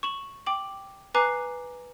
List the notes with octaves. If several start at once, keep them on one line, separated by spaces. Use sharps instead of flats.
C#6 E7 F#7
G5 D6 F#7
B4 G#5 A#5 D6 F#6 C7